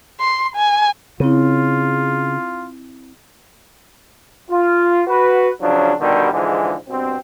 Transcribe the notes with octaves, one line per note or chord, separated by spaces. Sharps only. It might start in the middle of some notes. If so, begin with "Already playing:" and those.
C6
G#5
C#3 C4 E4 F4
F4
F#4 B4
C#3 F3 F#3 D4
B2 D3 D#3 G3
G#2 D3 E3 F3 G#3
G2 B2 C4